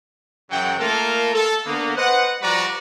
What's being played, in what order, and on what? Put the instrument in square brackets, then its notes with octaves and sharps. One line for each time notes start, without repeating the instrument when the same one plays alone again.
[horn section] F#2 C#3 E3 F#3 F#5 G5
A3 A#3 F4 A4 A#4
A4
D3 A#3 B3
B4 C5 D#5 F#5
F3 G3 F#4 B4 D5 A#5